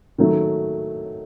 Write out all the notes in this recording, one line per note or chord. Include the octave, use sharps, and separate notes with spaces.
D#3 F#3 A3